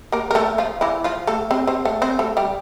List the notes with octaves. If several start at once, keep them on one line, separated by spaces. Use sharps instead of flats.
A#3 A#4
A#4
A3 A4
F3 F4
E3 E4
F3 F4
A3 A4
C4 C5
C4 C5
A3 A4
C4 C5
A3 A4
G3 G4